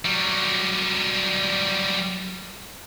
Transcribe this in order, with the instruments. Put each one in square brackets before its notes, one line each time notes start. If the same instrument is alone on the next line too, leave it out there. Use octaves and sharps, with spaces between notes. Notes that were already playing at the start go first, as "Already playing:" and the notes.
[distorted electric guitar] F#3 G3